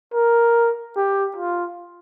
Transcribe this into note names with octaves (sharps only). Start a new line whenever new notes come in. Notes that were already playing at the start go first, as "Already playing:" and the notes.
A#4
G4
F4